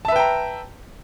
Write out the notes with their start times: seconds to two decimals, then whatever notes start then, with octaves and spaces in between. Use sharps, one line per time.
0.05 A5
0.08 E5
0.12 B4
0.16 G5
0.19 A#5